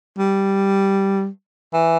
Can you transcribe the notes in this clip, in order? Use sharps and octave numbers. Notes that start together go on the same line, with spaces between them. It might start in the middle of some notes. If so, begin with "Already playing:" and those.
G3
E3